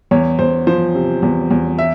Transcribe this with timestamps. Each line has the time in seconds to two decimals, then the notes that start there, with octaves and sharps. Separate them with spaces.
0.11 E2 C#5
0.39 E2 C5
0.67 F3 C5
0.95 C3
1.23 E2
1.51 E2
1.79 E5